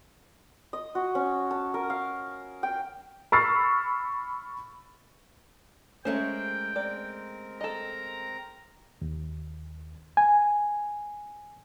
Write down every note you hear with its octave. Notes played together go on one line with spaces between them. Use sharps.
D#5
F#4
C#4
A5
A#4
F5
G5
B5 C#6 E6 F6 A6 C7
G#3 A3 C#4 A#4 C5 C#5 G5
C4 A#4 D5
A4 D#5 A#5
D#2
G#5